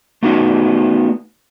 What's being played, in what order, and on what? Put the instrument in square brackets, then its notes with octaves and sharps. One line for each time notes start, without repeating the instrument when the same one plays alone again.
[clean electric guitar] A3 B3 D#4 F#4